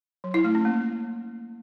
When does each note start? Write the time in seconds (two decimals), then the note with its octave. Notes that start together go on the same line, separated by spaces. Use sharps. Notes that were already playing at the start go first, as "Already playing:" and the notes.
0.24 F#3
0.34 E4
0.44 A3
0.55 C#4
0.65 A#3